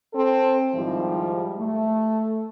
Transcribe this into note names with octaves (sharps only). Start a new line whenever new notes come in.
C4 A4
G#2 D#3 F3 G3 E4
A3